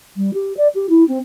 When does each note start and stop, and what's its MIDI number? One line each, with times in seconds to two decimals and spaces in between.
0.16 0.30 55
0.33 0.55 67
0.56 0.67 74
0.74 0.88 67
0.89 1.06 64
1.08 1.18 60